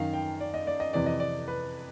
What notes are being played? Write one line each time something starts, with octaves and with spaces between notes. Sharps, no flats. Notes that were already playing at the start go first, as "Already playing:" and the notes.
Already playing: F#2 D#3 F5
G5
D5
D#5
D5
D#5
F2 C3 E3 D5
D#5
D5
B4